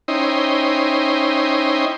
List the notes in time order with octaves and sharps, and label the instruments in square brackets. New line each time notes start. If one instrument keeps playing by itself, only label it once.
[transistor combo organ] C#4 D#4 E4 C5 D#5 G5